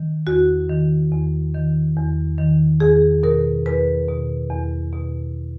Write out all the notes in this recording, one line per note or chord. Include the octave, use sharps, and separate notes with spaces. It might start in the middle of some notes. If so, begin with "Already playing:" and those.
Already playing: D#3
E2 F#4
D#3
E2
D#3
E2
D#3
E2 G#4
B2 A#4
E2 B4
B2
E2
B2